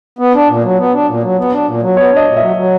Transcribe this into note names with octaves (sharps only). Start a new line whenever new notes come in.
B3
D4
A#2
F#3
B3
D4
A#2
F#3
B3
D4
A#2
F#3
B3 C#5
D4
D#5
A#2
F#3 E5
F#3